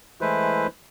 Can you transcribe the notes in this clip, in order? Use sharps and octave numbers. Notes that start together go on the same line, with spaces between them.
E3 G#3 A3 E4 B4 C5